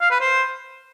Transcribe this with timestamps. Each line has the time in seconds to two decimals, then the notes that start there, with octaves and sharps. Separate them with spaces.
0.01 F5
0.11 B4
0.20 C5